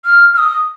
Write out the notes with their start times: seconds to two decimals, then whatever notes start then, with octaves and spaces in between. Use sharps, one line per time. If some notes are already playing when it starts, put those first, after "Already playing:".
0.05 F6
0.34 F6
0.38 D#6